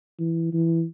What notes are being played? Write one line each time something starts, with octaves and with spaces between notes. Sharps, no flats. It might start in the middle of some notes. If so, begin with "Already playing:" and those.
E3
E3